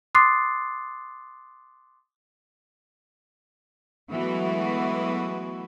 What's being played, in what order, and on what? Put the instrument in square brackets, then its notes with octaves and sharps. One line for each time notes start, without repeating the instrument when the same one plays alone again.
[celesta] C6 D6 D#6 F#6 A6 C7
[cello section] E3 F#3 G#3 A3 B3 F#4